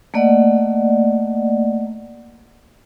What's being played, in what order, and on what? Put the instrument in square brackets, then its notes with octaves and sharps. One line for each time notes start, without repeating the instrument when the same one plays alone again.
[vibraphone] A3 A#3 D5 D#5 F#5